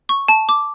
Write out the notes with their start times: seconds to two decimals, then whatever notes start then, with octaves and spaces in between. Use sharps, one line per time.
0.09 C#6
0.28 A5
0.49 D6